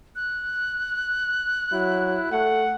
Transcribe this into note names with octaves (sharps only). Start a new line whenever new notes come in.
F#6
F#3 E4
A3 F#5